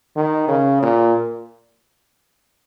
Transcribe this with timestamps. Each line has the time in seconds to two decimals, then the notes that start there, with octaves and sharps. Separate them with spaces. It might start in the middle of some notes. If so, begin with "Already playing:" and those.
0.16 D#3
0.48 C#3
0.82 A#2